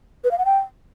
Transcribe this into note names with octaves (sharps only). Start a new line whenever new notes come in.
B4
F5
F#5
G5